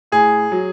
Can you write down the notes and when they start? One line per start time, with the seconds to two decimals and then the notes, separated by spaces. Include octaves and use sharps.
0.12 A2 G#4
0.52 F#3